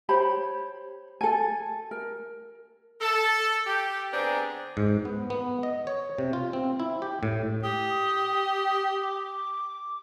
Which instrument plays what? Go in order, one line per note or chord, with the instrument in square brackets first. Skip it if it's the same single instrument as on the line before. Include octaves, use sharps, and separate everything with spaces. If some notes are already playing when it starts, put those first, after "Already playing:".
[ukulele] G4 C5 C#5 B5
A4 G#5
A#4
[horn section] A4
G4
D3 B3 C4 D4 G#4 A#5
[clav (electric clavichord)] G#2
B3
B3
D#5
C#5
C3
F4
C4
E4
G4
A2
[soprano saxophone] G4 [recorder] D#6
[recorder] D6